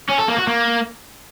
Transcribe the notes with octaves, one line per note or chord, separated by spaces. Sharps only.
C#4
A4
A#3
F#4
A#3